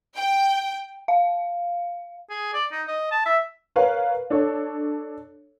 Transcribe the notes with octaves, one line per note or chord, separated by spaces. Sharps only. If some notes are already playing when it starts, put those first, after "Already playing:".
G5
F5
G#4
D5
D#4
D#5
A5
E5
A#4 B4 C#5 F5
D4 A4 C#5